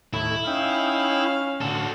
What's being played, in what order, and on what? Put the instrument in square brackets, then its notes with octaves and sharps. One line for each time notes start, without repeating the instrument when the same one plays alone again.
[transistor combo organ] D#2 A2 [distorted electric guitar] E4
[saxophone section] C#4 [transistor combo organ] D#4 G5 E6 [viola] F5
[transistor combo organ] A2 D3 [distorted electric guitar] F#4 A4